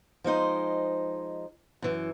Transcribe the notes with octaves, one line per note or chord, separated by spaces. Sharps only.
F3 G#3 D#4 C5
F#2 E3